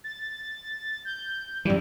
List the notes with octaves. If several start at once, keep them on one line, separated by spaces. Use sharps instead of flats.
A6
G6
F#2 E3 G3